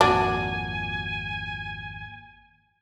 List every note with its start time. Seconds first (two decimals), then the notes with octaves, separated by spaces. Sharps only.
0.01 G#1 F2 A#2 D4 F#4 G#5